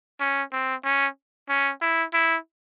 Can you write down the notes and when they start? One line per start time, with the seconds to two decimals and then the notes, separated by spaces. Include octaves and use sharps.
0.20 C#4
0.53 C4
0.84 C#4
1.49 C#4
1.82 E4
2.14 E4